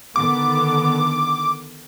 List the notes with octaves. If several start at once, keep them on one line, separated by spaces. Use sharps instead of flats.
D3 D#3 B3 D6